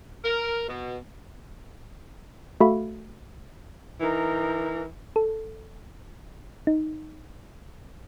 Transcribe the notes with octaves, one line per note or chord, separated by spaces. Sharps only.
A#4
B2
A3 F#4 A4 E5 F5 B5
E3 D#4 A#4
A4
D#4